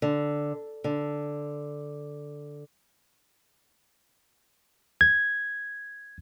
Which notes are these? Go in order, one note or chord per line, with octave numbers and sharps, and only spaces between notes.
D3
D3
G#6